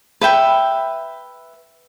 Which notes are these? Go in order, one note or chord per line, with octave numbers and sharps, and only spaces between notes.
B4 E5 G5 B5